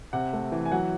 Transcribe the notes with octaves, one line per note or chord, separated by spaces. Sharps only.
C3 F#5
A3
E3
G#5
F#3 F#5